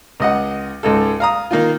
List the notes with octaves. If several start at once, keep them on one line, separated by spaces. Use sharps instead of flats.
C#2 D#5 F#5
C#2 G#2 A4
F5 A#5 D#6
D#3 A#3 D#4 F4